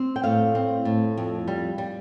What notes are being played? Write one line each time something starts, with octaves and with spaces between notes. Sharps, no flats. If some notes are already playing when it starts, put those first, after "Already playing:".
Already playing: C4
G5
A2 F5
C4
A2
F2
G3
G3